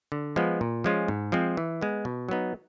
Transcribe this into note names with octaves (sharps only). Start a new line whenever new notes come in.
D3
F3 G#3 B3
A#2
F3 G#3 C#4 F4
G#2
F3 G#3 C4
E3
G#3 B3
B2
F#3 B3 D#4